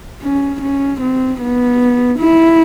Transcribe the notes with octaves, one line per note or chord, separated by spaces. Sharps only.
C#4
C#4
C4
B3
E4